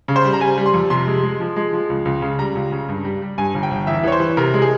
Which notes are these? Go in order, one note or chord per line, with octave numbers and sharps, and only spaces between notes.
C#3
C5
G3
A#5
G3 G#5
G3
C6
F2
C3 C6
G#3
G#3
F3
G#3
F3
C#2
C#2
C#3
G3 A#5
C#2
C#3
G2
G3
G3
G2 G#5
G1
G5
G1
E2 E5
E3 C#5
C5
E3
C3 A#4
G#3
G#4